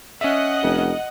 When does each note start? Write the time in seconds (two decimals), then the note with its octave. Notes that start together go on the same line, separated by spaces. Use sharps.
0.21 C#4 D#5 E5 F#5
0.63 F1